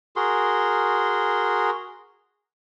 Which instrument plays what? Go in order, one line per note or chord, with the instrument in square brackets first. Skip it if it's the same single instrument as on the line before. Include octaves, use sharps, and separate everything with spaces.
[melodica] F#4 G#4 A#4 C6